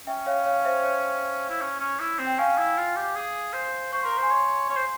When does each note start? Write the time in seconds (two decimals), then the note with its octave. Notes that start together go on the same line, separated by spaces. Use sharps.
0.07 C#4 E5 G5
0.26 C#5 F5
0.46 C#5 F5
0.65 C5 E5
0.84 C#5
1.50 E4
1.61 C#4
1.80 C#4
2.00 E4
2.19 C4
2.27 G5
2.38 C#4 F5 G#5
2.58 E4
2.78 F4
2.96 G4
3.16 G#4
3.53 C5
3.92 C5 C#6
4.03 A#4 C6
4.12 A#5
4.18 C5 G#5 C6
4.31 C#5
4.70 C#5
4.77 C5